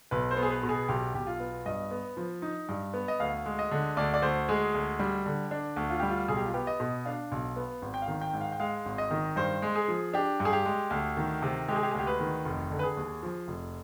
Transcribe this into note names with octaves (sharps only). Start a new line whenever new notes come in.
B1 B4
C5
B3
G#4
B4
B2
G#4
B1 G4
B1 G4
F4
B3
G2 D#5
B3
F3
D#4
G2
B3
D#5
D2 F5
G#3
D#5
D3
D2 D5
D5
D2 C5
G#3 G#4
D2
G3
D3
D4
D2
F4
G3 G4
F4
B1 G#4
G4
F4
B3 G4
D#5
B2
D4 F5
B1
B3
G#1
G5
F5
D#3
G5
G#2
F5
G5
G#3 F5
G#1
D#5
D#3
G2 C5
G#3
G#4
F3
D4 G4
G2
G#4
G4
G#3
D2
D#3
C3
G#3 G4
G#4
G4
G#4
D2
G4
B4
D#3
F1
D3
B4
G#4
D#2
F3
F1